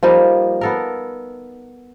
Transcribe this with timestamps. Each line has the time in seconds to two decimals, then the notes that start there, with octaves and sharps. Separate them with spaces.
0.03 F3 G3 A#3 D#4
0.61 B3 A4 A#4